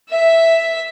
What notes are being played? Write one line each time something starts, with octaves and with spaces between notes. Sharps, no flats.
E5